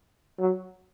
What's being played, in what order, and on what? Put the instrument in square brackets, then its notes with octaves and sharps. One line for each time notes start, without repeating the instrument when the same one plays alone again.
[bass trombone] F#3